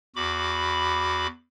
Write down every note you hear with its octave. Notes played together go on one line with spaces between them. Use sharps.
E2 F#4 B5 D6